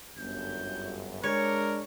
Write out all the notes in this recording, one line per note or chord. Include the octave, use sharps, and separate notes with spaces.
G1 F#2 G6
G#3 D4 A#4 C#5